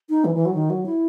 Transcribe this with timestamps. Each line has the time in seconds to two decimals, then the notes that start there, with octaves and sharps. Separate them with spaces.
0.10 D#4
0.25 E3
0.35 E3
0.45 F#3
0.55 D#3
0.70 F#3
0.86 E4